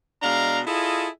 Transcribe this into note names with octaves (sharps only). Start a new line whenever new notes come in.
B2 G#3 D4 F5 A#5
E4 F4 G#4 A4 D#5